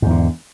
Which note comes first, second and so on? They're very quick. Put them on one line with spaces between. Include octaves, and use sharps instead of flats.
G#2 E2 D3